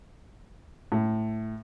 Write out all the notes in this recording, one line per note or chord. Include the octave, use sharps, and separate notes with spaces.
A2